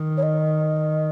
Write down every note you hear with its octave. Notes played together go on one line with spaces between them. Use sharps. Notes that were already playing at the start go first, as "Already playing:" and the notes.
Already playing: D#3
C#5
D#5